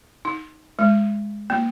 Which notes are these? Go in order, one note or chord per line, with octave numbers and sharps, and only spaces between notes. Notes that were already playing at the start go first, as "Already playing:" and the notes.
D#4
G#3
A#3